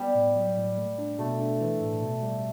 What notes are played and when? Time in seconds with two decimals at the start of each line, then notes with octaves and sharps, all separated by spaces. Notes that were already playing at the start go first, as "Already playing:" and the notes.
Already playing: G3 B3
0.15 A2
0.35 F#3
0.57 A2
0.78 A3
0.98 D4
1.19 B2 A3
1.40 D4
1.61 E3
1.81 A2
2.02 B2
2.23 G3